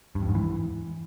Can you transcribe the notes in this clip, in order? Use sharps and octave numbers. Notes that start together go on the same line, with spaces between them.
G2
F2
G#2
E3